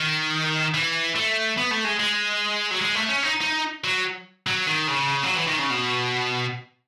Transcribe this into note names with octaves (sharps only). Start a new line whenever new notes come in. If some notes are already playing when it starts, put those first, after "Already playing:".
Already playing: D#3
E3
A3
B3
A3
G#3
G#3
F#3
G#3
A3
C#4
D#4
D#4
F#3
F#3
D#3
C#3
F#3
E3
D#3
C#3
B2